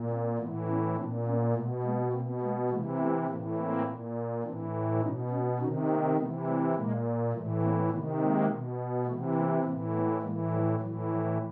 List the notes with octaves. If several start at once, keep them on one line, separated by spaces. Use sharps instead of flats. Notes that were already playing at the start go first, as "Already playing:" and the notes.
Already playing: A#2
A#3 C4
A2 E3 A3 B3
B3 C#4
A#2 C4 D4
B3 C#4
B2 A3 B3
G#3 A#3
B2 A#3 C4
G#3 A#3
C3 E3 G#3 A#3
A3 B3
A2 E3 A#3 C4
A#3 C4
A#2
A2 E3 C4 D4
B2 C#4 D#4
B3 C#4
C3 D#3 C#4 D#4
A#3 C4
C3 E3 A3 B3
G3 A3
A#2 G#3 A#3
A2 E3 G3 A3
A#3 C4
C3 D#3 A3 B3
G#3 A#3
B2
C3 E3 A3 B3
A#3 C4
A2 E3 A#3 C4
A3 B3
A2 E3 G#3 A#3
F3 G3
A2 E3 F#3
F3